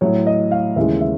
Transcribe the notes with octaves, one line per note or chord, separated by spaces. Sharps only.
A2 F#3 C#5
D#5
F5
D#2 C#3 E3 G#3 E5
E5